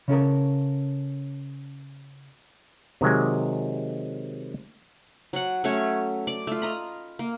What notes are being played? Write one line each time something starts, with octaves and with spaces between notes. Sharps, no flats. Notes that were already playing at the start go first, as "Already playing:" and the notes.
C#3 C#4 A4 A#4
C3 D#3 F#3 G#3
F#3 F#5
F#3 A3 C#4 C#5
D5
A3 F4
D#5 A#5 B5
A#3